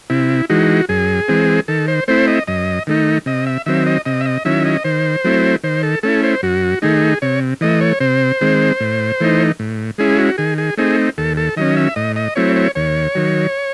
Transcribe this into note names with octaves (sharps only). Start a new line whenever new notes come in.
C3 E4
E3 G#3 D#4 F#4
F#2 G#4
E3 G#3 C4
D#3 A4
C5
A3 C4 E4 C5
D#5
F#2 D#5
D#3 A3 D#4
C3 D#5
E5
D#3 F#3 C4 E5
D#5
C3 D#5
E5
D#5
D#3 F#3 C#4 E4 E5
D#5
D#3 C5
F#3 A3 C4 E4
D#3 C5
A4
A3 C#4 E4 A4
C5
F#2 F#4
D#3 A3 D#4 G#4
C3 C#5
E3 A3 D#5
C#5
C3 C5
D#3 G#3 C4
A2
E3 A3 D#4
A2
G#3 C#4 E4 G#4
F#4
D#3 G#4
G#4
A3 C4 D#4 G#4
D#2 A4
A4
D#3 F#3 C#4 D#5
E5
A2 D#5
D#5
F#3 A3 C4 E4 C#5
C#5
D#2 C#5
D#3 F#3